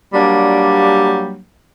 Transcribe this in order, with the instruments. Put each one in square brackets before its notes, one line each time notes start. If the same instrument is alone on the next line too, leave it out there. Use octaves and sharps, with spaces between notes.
[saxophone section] F#3 G3 A#3 D4